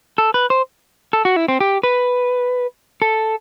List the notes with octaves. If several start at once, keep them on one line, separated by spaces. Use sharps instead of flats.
A4
B4
C5
A4
F#4
E4
C4
G4
B4
A4